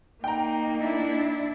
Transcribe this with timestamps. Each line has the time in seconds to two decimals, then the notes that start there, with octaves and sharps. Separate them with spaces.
0.24 A#3 D#4 G5 A#5
0.80 D4 E4